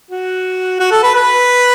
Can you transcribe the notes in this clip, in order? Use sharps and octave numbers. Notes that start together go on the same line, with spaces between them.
F#4
F#4
A4
B4
B4